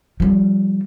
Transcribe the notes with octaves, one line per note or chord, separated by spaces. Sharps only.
F3 G3